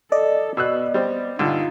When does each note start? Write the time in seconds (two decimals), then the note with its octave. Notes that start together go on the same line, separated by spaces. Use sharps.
0.12 A4 D5 D#5
0.57 B2 B3 E6 F#6
0.94 G3 C4
1.39 G2 A#2 D3 D#4 F4